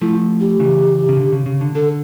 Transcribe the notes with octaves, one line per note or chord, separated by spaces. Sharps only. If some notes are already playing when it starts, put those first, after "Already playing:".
F3 A3 E4
G4
C#3 E3
C#3
D3
C#3
C#3
D3
D3 A4